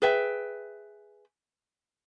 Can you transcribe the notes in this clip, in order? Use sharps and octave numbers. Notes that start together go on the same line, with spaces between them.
G#4 B4 E5 G5